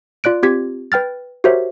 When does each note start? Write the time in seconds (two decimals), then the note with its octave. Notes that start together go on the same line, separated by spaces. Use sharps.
0.24 F4 D5 F#6 D7
0.43 C4 F4 G4 G#6 B6
0.92 B4 G5 F6 A6
1.44 F#4 G4 A#4 C5 C#5 E5